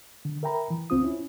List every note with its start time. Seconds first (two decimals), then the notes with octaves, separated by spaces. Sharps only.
0.25 D3
0.43 A#4 E5 G5 A#5 B5
0.70 E3
0.90 C#2 C4 F4 D#6
1.03 C#4 E4